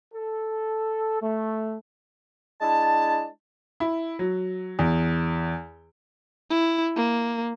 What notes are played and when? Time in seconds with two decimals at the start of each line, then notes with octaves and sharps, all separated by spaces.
0.14 A4
1.21 A3
2.62 G#3 D4 E4 A5
3.80 E4
4.19 F#3
4.79 E2
6.50 E4
6.96 A#3